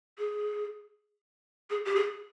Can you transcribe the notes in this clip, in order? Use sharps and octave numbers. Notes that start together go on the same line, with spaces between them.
G#4
G#4
G4
G#4